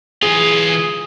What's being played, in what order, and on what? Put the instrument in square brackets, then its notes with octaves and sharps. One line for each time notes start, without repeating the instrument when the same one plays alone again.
[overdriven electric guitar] E3 F4 [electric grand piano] G#4